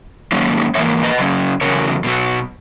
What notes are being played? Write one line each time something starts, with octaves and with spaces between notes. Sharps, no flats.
G#2 D#3 F#3 A#3 C#4
G#2 E3 A#3 C#5 E5
B4 D#5
C#3 F#3 C#4
E2 C#3 F#3 C#4 A#4 C#5
B2 F#3 B3